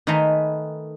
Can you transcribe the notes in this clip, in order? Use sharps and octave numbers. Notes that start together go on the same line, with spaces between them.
D#3 A3 B4 G#5 A#5 C6